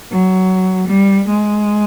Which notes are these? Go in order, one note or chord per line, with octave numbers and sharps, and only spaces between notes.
F#3
G3
G#3